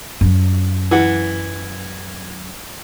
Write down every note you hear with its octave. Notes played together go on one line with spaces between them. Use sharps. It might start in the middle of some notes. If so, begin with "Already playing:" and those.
F#2 F#3
E3 F#5